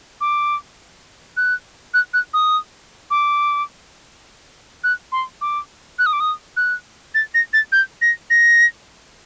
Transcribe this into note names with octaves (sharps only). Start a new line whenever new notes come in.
D6
F#6
F#6
F#6
D#6
D6
F#6
C6
D6
F#6
D#6
D6
D#6
F#6
A6
A#6
A6
G6
A#6
A#6